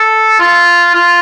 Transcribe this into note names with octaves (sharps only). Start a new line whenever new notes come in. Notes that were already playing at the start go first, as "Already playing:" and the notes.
Already playing: A4
F4
F4